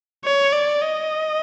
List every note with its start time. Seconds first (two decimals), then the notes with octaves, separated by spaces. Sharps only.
0.25 C#5
0.53 D5
0.82 D#5